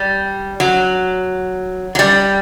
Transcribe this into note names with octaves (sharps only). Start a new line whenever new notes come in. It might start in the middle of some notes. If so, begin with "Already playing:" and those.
Already playing: G3
F#3
F#3
G3